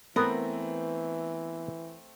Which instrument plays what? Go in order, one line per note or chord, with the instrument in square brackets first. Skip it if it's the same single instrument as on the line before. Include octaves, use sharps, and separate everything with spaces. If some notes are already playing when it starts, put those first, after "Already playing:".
[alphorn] E3 [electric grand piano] A3 C4 [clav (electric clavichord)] B3 [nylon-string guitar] A#4